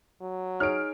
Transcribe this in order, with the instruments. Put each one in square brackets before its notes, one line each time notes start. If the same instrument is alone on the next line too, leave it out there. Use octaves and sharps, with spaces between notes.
[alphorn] F#3
[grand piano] D#4 G#4 C#5 [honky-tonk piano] F6 D7